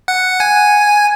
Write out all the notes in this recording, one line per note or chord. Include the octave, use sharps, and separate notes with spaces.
F#5
G#5